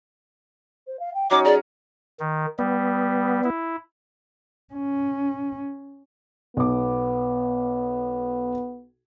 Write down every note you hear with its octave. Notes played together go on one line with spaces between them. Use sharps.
C5
F5
G5
F#3 C#4 D#4 C#5 D6
G#4 D5 A#5
D#3
G3 B3
E4
C#4
B1 B3 D6